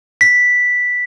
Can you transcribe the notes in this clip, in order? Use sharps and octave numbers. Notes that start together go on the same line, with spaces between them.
B6